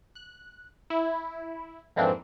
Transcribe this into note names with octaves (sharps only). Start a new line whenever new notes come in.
F#6
E4
F2 G#2 E3 A#3 C4 D4